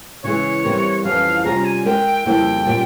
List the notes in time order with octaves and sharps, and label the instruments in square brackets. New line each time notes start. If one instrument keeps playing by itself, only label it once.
[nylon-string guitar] C#3 E3 G#3 E4 G#4 [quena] C#5
[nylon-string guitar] E3 G3 C4 G4 A#4
[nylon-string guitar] F2 E3 G3 C#4 [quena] F5
[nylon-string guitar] C3 G3 C#4 F4 G#4 [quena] A#5
[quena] G#5
[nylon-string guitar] G#3 E4 A#4 E5 [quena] G5
[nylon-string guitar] F2 C#3 G3 A#3 E4 [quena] G5
[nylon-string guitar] A#2 G3 A#3 C#4 F4